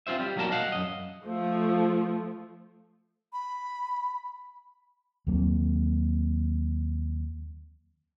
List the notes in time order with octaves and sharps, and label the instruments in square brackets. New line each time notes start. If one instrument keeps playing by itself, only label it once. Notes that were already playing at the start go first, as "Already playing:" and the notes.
[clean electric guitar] C4 D#4 F4 C5 E5
G3
B1 F#3 A#3 C4 A#4 A5
D#5 F5 F#5
F#2 D#5
[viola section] F3 A3
[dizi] B5
[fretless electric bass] D#2 F#3 A#3 C4